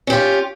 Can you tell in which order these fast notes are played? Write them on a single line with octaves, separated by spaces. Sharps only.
C#4 G4 F4